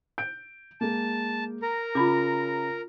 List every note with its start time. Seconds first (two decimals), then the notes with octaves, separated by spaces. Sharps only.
0.18 G6 D7
0.81 G#3 A#3 A5
1.62 A#4 A#5
1.95 C#3 F4 B5 D6